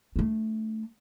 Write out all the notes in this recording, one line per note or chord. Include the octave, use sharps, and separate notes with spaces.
A3 D4